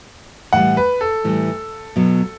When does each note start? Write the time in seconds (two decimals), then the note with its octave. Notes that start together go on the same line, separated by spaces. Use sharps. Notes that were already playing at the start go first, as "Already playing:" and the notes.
0.53 A2 E3 G3 F#5
0.77 B4
1.01 A4
1.24 A2 E3 G3
1.96 B2 F#3 B3